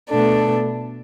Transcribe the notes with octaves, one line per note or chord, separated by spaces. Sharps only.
B2 A3 D4 A4